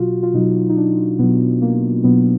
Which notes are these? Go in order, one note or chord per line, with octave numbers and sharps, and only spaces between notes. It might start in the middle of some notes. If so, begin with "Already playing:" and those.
Already playing: B2 F#3 F4 F#4
F4
B2 F#3 D#4
D#4
D4
B2 F#3 B3
A#3
B2 F#3 B3